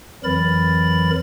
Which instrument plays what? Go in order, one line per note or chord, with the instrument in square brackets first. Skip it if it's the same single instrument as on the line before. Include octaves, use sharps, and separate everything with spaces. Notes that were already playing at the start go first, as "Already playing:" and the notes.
[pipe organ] F2 E3 F#3 A#4 B5 A6